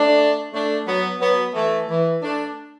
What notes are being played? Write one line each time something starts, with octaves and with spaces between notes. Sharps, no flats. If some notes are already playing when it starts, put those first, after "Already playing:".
Already playing: A3 D4
A3 D4
F#3 B3
F#3 B3
E3 A3
E3
A3 D4